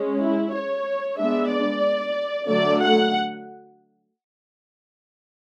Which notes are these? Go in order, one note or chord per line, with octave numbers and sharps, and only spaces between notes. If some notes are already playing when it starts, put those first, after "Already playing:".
Already playing: G#3 C#4
E4
C#5
G#3 B3 D4 E5
D5
D3 F#3 A3 D5
F#5